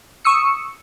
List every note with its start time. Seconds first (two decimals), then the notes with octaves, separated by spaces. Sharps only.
0.25 C#6 D#6 E6 C#7